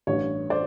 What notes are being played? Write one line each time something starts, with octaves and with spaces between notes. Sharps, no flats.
A1 G2 E3 C#5
C5 D5